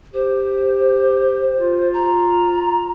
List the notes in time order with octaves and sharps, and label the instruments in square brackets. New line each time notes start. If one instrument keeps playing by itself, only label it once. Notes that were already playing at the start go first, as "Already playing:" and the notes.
[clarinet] G4 [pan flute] C5
[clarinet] F4
[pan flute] A#5